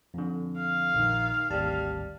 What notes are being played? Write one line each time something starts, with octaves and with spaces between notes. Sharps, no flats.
F2 D3
F5
A#1 D#3
G#1 D2 G3 A5